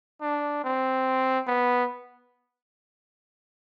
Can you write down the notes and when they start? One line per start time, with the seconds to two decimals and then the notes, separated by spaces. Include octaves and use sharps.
0.21 D4
0.64 C4
1.47 B3